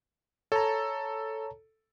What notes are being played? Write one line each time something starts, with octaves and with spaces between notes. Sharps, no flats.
A4 C#5 A5 A#5